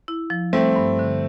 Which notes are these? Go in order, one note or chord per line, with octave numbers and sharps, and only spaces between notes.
E4
F3
G3 A3 C4
G2
D3